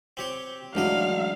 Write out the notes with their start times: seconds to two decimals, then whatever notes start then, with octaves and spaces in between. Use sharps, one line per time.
0.17 C4 G4 C#5
0.75 A1 F#3 G#3 D4 E4 D#5 F5